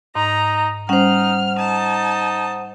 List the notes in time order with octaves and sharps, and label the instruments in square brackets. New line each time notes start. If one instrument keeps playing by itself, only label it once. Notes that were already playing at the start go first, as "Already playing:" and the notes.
[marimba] G#2 [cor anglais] D#4 [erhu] A#5
[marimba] G3 C#4 [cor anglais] D#4 [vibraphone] C5 F#5 [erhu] F6
[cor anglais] D#4 [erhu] A5